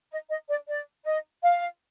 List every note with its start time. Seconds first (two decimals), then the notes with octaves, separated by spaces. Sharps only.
0.11 D#5
0.30 D#5
0.49 D5
0.68 D5
1.05 D#5
1.42 F5